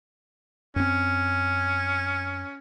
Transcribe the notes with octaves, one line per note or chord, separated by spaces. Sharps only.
F#2 C4 C#4